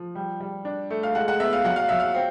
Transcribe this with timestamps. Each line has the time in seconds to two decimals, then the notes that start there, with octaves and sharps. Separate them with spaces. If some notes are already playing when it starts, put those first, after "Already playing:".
Already playing: F3
0.15 G3
0.40 G3
0.65 D4
0.90 A3
1.03 F5
1.15 G#3 F#5
1.28 F#5
1.40 B3 E5
1.53 F5
1.64 F#3 F#5
1.76 F5
1.89 F#3 E5
2.00 F5
2.14 C4